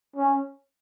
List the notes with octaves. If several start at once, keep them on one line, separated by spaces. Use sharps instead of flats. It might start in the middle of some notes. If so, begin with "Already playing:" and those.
C#4